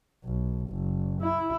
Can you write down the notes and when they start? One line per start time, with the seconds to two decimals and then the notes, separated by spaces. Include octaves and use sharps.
0.24 B1
0.70 F#1
1.21 E4